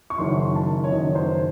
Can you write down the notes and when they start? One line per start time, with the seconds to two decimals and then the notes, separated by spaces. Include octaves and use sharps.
0.10 C#6
0.18 F#1 F#2 D#3 C6
0.55 A5
0.84 C#5
0.91 F#1 F#2 D#3 D#5
1.15 C5